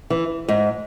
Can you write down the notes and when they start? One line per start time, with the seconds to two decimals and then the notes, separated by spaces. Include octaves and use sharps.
0.10 E3
0.48 G#2